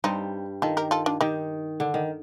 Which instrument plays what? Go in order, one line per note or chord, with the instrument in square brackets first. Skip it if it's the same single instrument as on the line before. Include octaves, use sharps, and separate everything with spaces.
[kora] G2 G3 [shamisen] C4 D#4
[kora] D#3 [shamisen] F4 A4
[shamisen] G4 A#4
F4 A4
D4 F4
[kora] D#3 [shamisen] D#4 G4
[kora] D3
D#3